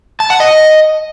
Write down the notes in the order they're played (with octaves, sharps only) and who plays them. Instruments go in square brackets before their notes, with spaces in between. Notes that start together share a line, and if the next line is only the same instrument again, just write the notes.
[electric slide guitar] A5
F#5
D#5